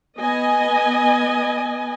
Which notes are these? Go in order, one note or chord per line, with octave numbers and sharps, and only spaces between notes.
B3 D#5 G#5